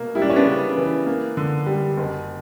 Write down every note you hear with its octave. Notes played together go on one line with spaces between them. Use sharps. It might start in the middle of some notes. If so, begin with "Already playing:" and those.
Already playing: B2 A#3
G3 E4
D4
C#4
B3 D4
C#3
E3
A#3
D3
G3
F#1